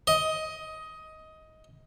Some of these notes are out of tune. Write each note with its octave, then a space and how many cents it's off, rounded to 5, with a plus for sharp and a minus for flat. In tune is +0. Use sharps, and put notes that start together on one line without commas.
D#5 +15